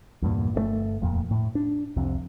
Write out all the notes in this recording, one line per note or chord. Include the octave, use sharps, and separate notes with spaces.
E2 G2 A#2
G1 C3 A3
D#1 F2 A#2
A2
D4
C2 F2 C3